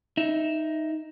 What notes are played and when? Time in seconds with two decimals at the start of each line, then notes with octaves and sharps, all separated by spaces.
0.17 D#4 E5